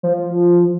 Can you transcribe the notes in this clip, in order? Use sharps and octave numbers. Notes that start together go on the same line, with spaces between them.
F3